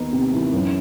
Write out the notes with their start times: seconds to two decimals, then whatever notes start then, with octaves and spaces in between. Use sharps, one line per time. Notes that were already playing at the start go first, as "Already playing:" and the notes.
Already playing: D#2 D#3 B3 D#4
0.13 C3
0.33 E3
0.53 F#2